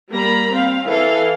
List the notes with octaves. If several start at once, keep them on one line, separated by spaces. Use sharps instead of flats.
G3 A#3 A#5 B5
C4 F5
E3 A4 F5